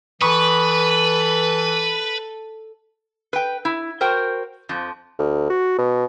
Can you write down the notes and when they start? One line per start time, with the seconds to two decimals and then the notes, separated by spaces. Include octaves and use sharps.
0.21 E3 A4 B4 B5 C#6 D#6
3.33 B4 G5
3.65 E4
4.01 F#4 A#4 C5 G5
4.69 F2 F3
5.19 D2
5.50 F#4
5.78 B2